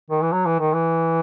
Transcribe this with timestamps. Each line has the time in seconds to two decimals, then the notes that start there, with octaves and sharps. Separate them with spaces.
0.10 D#3
0.21 E3
0.32 F#3
0.46 E3
0.60 D#3
0.73 E3